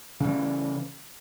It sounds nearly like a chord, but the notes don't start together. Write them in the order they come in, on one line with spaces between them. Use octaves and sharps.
C#3 G3 E3